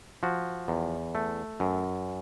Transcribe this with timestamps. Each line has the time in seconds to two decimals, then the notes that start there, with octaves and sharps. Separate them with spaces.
0.23 F3 F#4
0.68 E2
1.15 A3
1.60 F#2